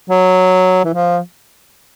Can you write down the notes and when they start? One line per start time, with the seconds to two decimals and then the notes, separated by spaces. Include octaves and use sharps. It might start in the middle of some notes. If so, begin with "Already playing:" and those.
0.10 F#3
0.85 E3
0.94 F3